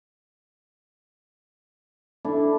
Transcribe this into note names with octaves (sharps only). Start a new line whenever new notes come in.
D4 E4 A4